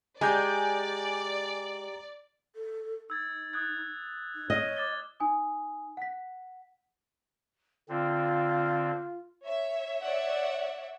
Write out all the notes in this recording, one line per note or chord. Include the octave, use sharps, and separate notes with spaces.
G#3 G4 D5 G#5 A#5 G6
A4
D#4 E6 G#6 A6
D#6 F#6 G#6
D#4
C#5 D#5 F6
D6 A6 G7
D#4 G#5 D#6
F#5 B6
D3 C4 F4
C#5 E5
C#5 D5 E5 F#5